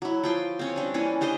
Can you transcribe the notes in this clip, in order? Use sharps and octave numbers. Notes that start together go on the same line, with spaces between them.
F#3 E4
F3 G5 C6
C4 C#4 C#5
G3 D4
E3 A#3 C#4
D4 G4 C5 D#5